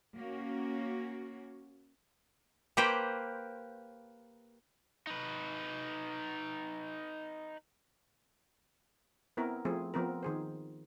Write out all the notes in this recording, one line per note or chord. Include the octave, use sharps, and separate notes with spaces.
A#3 C#4 F#4
A#3 G4 B4 C5 G5
D#4 B4
B3 C4 E4 A#4
F3 A3 C4 G#4
F3 B3 C4 A#4
D#3 G#4 C5